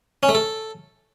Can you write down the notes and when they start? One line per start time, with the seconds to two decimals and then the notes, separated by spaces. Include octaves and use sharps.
0.23 C#4
0.29 A3
0.35 A4